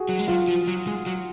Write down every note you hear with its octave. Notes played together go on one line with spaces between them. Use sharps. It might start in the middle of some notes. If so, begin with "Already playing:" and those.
Already playing: F#4 G#4
F#3
G#3
F#3 F4
F3
F#3
G#3
F#3